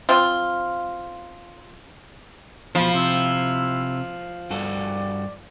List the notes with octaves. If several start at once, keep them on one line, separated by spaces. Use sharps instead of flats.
F3 C4 F4
E2 B2 F3 B5
C3 E4
G2 F#4 A4 D5